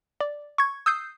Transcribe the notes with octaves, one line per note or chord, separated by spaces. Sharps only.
D5
C#6 G#6
D#6 E6 G6 C7